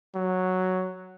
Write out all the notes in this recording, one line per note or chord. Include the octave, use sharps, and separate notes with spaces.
F#3